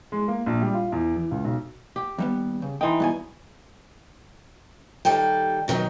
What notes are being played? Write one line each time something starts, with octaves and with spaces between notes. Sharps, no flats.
G#3
A#3
A#1
G3
F4
E2
E3
C#2
B1
G4
D#2 G3 B3
C#3
E3 D#4 G5 C6
G2 B2 G#5
D#3 G3 A4 G5
B2 D#3 F3 F#3